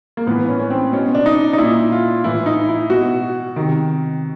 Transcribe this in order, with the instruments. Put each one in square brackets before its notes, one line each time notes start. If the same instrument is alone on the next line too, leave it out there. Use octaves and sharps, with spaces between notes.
[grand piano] A#3
A2 E3 B3
C#4
C#4
C4
B2 C#4
D4
D#4
D#4
A#2 E4
F4
A2 E3 E4
D#4
E4
B2 F#4
C3 D#3